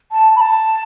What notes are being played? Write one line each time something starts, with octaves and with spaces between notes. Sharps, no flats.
A5
B5
A5